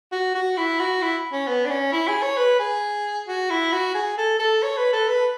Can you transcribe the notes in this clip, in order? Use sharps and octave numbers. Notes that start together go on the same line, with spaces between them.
F#4
F#4
E4
F#4
E4
C#4
B3
D4
C#4
E4
G#4
C#5
B4
G#4
F#4
E4
F#4
G#4
A4
A4
C#5
B4
A4
B4